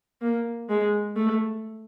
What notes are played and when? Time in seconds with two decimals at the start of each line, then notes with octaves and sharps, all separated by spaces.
0.22 A#3
0.70 G#3
1.16 A3